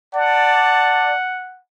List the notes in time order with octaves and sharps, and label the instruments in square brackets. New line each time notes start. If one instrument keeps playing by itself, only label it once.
[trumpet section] D5 A5 [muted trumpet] F#5